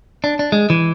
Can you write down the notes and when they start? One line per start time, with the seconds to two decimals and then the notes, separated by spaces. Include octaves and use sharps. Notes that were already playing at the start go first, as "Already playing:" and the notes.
0.24 D4
0.39 D4
0.52 G#3
0.70 E3